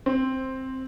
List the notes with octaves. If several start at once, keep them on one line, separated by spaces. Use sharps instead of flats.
C4